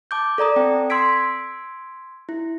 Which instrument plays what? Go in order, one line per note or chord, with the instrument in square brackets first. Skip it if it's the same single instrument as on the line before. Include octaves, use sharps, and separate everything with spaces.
[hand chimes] A5 D6 G6
A4 D5 A#5 D#6
C4 G5
C6 E6 G#6 B6 D7
E4